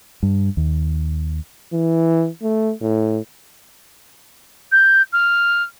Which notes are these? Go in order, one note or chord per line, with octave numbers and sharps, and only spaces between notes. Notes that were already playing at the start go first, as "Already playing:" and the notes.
G2
D#2
E3
A3
A2
G6
F6